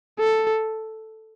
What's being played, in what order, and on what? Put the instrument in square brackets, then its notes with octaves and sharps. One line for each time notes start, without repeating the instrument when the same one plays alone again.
[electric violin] A4